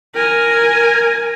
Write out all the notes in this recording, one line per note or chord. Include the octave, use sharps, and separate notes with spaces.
A#4 G#5